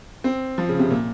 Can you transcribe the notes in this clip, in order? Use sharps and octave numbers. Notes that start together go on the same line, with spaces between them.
C4
F3
C#3
C3
A#2